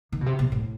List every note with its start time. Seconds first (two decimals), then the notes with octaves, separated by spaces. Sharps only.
0.12 D#3
0.21 B2
0.26 C3
0.39 B2
0.52 A2